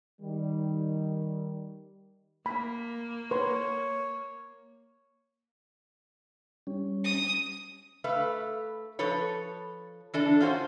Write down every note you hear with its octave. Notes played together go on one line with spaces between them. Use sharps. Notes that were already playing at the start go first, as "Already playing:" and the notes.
D#3 G3
A#3 B5
B4 C#5 C6
G3 C#4
D#6
A3 B4 F5
F3 A4 B4 C#5
E3 D4 A4
C#4 F4 F#4 C5